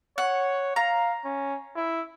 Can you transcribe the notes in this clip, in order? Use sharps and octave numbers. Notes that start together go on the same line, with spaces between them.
C#5 F#5
F5 A#5
C#4
E4